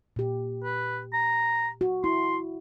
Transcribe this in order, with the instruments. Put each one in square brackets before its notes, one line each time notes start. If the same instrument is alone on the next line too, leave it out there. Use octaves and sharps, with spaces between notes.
[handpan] A#2 G4
[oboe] B4
A#5
[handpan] F#4
[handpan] E4 [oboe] C6